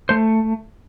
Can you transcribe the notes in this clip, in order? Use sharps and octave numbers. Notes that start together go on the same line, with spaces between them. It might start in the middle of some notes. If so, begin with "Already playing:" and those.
A3 C5